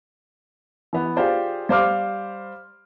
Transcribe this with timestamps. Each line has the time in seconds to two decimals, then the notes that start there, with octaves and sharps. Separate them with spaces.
0.93 E3 B3
1.17 F4 G4 G#4 C5 D5
1.69 G3 C5 F5 D6 F6